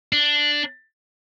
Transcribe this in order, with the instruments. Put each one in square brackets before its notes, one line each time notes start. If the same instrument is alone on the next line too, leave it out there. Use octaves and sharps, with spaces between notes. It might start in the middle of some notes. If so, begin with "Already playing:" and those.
[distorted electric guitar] D4